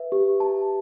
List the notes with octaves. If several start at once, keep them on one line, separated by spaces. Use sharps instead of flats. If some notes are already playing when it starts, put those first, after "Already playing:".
Already playing: B4 E5
G4
A5